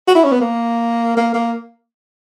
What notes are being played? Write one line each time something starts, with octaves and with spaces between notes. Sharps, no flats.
F#4
E4
C#4
B3
A#3
A#3
A#3